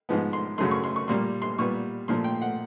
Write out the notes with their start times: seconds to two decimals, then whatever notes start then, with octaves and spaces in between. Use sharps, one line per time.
0.09 G#2 F3 G#3 B3
0.33 C6
0.58 F#2 C#3 F#3 A3 C6
0.71 C#6
0.84 C6
0.96 C#6
1.08 A#2 G3 A#3 C6
1.42 C6
1.59 A#2 G3 B3 C#6
2.08 A#2 F3 A3 C6
2.24 G5
2.42 F#5